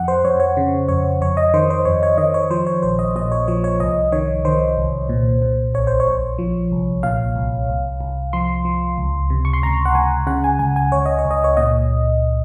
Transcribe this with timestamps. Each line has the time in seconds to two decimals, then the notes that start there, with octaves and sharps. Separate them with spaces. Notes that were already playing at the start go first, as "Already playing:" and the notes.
Already playing: F2 F#5
0.08 C5
0.24 F2 C#5
0.40 C#5
0.57 C#3
0.89 F2 C#5
1.21 F2 C#5
1.37 D#5
1.54 D#3 C5
1.70 C5
1.85 F2 C#5
2.03 C#5
2.18 D#3 D#5
2.34 C#5
2.50 F3 C5
2.67 C#5
2.83 A#1 C5
2.99 D#5
3.16 A#2 D#5
3.32 C#5
3.48 F3 C#5
3.64 C#5
3.80 C2 D#5
4.12 D#3 C#5
4.45 D#3 C5
4.78 C2
5.09 A#2
5.42 A#2
5.74 A#1 C#5
5.87 C5
6.00 C#5
6.07 A#1
6.38 F3
6.72 C2
7.03 A#2 F5
7.36 C2
7.69 C2
8.01 C2
8.33 F3 C6
8.65 F3
8.98 C#2
9.30 C3
9.45 C#6
9.53 C6
9.63 C#2 A#5
9.85 F#5
9.95 C#2 G#5
10.27 C#3 F#5
10.44 G#5
10.59 C#2 G#5
10.76 G#5
10.92 C#2 C#5
11.06 D#5
11.19 C#5
11.25 C#2
11.31 D#5
11.44 C#5
11.57 A#2 D#5